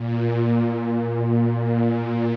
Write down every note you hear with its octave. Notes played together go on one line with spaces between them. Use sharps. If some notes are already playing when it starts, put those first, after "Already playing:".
Already playing: A#2
A#2